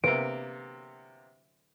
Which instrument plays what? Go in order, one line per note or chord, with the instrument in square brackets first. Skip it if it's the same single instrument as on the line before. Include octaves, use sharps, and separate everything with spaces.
[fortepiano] C3 A#3 B3 [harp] D7